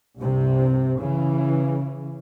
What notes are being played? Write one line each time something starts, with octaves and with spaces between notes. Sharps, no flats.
C2 G2 C3
C#3 E3